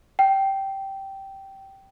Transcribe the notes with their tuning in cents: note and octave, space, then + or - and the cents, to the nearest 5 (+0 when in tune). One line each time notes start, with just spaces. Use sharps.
G5 -10